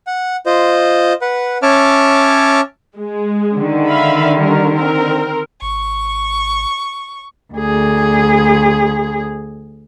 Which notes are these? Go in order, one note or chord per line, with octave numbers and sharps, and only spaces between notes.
F#5
F4 C5 D#5
B4 F#5
C#4 C#5 E5 A5 D6 F6
G#3 G#4
D3 D#3
E5 F5 B5
G3 A#4
C4 A#4
G#1 C#6
D2 G#4